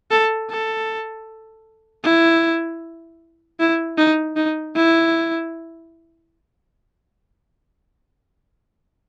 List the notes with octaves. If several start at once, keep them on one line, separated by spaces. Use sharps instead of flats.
A4
A4
E4
E4
D#4
D#4
E4